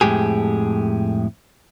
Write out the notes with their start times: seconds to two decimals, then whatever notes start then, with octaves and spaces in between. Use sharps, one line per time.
0.01 F2 A2 E3 G#3 G4 G#4